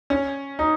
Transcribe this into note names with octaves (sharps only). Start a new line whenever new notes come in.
C#4
D#4